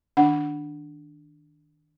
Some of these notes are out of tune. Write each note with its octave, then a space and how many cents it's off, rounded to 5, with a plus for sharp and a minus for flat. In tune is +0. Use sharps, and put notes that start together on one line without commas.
D#3 +0 D4 +0 F#5 +0